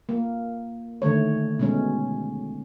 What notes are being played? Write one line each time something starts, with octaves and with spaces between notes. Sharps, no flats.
A#3
D3 D#3 A3 C#5
B2 G#3 C#4